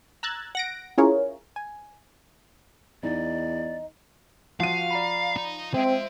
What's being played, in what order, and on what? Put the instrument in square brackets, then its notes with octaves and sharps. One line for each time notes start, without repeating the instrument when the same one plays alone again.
[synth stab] A#5 E6 F#6 G#6 A6
F#5 A#6 D7
C#4 E4 F4 G#4 A#4 C#5
G#5
[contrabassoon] E2 [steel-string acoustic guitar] D#4 [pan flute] D5
[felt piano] F3 D#7 [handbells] F4 F#4 F#5 [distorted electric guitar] F5
[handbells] D5 A#5 B5
[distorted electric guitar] D#4
[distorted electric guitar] G#3 [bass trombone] C4 [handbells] C5 E5 D7